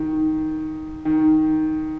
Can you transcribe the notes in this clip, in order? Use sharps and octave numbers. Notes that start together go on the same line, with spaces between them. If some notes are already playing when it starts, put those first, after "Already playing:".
Already playing: D#3
D#3